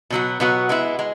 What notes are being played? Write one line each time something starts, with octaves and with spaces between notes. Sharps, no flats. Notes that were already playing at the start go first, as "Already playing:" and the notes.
B2 F#3 B3 F#4
B2 F#3 B3 F#4
G#3 B3 E4
G#3